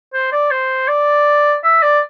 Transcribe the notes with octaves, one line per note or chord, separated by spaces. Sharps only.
C5
D5
C5
D5
E5
D5